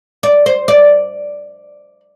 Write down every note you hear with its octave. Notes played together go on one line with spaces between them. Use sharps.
D5
C5
D5